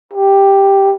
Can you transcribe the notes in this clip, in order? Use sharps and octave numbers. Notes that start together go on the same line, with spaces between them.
G4